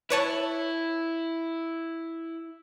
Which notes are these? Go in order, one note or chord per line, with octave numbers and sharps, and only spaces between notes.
E4 B4 C#5 A5